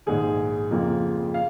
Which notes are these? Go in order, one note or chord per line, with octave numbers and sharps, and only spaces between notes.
A#1 G#2 D#3 G#4
F2 C#3 F3 A#3
F5